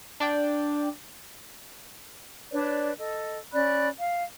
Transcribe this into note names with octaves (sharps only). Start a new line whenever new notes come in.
D4 D5 G5
D4 B4 C#5 D5
A4 D#5
C#4 D5 B5 F#6
F5